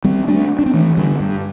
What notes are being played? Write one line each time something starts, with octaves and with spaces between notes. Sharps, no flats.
G3 C4
A3 D4
D4
C4
E3 A3
D3 G3
G2